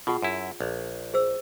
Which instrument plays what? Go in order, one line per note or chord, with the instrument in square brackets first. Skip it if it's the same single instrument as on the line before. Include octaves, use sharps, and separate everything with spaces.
[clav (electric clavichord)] B2 [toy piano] F4 G#4 F#5
[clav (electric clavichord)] F#2 E4
A#1
[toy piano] G#4 C5 E6